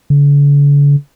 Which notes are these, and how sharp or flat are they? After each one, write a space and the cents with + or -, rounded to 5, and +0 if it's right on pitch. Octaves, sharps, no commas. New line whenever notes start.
D3 -45